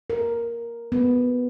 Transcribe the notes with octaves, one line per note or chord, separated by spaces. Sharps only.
A#4
B3